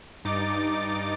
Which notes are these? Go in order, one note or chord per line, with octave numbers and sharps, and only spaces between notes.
G2 D#4 D6 A6